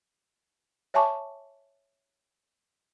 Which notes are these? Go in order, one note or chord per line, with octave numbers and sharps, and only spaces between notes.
C#5 E5 G#5 A5 C#6 D6